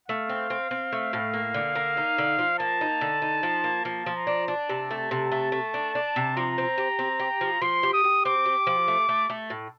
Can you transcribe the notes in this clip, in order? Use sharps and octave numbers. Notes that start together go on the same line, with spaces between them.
A3 F5
C4
C4
C4
A3
A2
A#3
D3
A#3
D#4
D3
F3
A#3 A5
D#4
D3
D#4
F3
A#3
F3 A5
F3
A#5
D4
D4 A5
C3
A3
C3 A5
A3
A3
D4
D4
C3
F3 A#5
C4
G4
C4
G4
F3
F3 C6
G4
D#6
G4
C4 D6
G4
F3
A3
A3
A3
A2